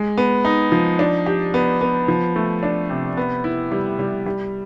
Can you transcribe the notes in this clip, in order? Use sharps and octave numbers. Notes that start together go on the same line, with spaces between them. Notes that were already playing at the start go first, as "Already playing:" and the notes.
Already playing: G#3
B3
D#4
F3
D4
G4
B3
B3
F3
A3
D4
C3
B3
E4
G3
G3
G3